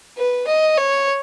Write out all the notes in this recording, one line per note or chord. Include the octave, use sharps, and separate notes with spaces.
B4
D#5
C#5